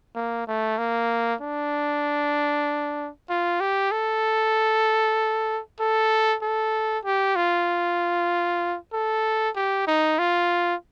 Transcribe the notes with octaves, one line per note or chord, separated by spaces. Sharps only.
A#3
A3
A#3
D4
F4
G4
A4
A4
A4
G4
F4
A4
G4
D#4
F4